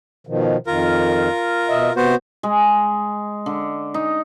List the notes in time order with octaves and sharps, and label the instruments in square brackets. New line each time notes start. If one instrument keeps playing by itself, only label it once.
[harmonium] B2 D#3 F3
[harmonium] F2 D#3 [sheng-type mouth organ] F4 A#4
[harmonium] B2 D#5 E5
[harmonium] C3 [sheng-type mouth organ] B3 F#4 C5
[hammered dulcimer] G#3
D3
D#4